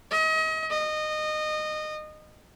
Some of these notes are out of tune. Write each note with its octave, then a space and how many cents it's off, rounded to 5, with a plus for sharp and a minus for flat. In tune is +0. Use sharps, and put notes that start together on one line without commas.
D#5 +35
D#5 -20